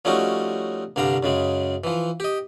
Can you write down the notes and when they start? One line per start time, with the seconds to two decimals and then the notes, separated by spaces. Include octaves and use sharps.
0.05 F3 G3 A3 C#4 D#4 F#4
0.96 C2 G2 D3 G3 F5 A#5
1.23 F#2 C#3 G#3
1.84 E3 F3
2.20 G4 D#5